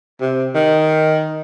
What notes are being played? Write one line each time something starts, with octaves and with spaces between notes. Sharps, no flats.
C3
D#3